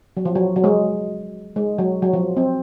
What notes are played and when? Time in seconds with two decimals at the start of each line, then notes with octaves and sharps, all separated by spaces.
0.17 F#3
0.25 F3
0.35 F#3
0.56 F#3
0.64 G#3
1.56 G#3
1.78 F#3
2.02 F#3
2.13 F3
2.37 C4